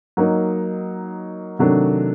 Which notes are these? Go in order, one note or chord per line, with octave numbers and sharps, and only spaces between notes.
F#3 A#3 D#4
C3 D#3 F#3 A3 D4